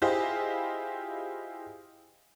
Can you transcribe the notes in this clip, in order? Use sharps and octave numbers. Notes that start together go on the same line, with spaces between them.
E4 F4 G4 G#4 C5 D#5